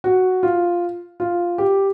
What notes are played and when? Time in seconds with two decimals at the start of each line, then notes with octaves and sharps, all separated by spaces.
0.04 F#4
0.43 F4
1.20 F4
1.58 G4